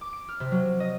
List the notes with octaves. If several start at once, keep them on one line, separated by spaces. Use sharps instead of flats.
D6
D7
F6
C3
F#3
D#5